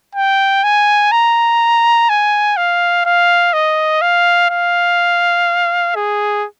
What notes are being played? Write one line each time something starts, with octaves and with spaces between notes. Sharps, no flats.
G5
G#5
A#5
G#5
F5
F5
D#5
F5
F5
G#4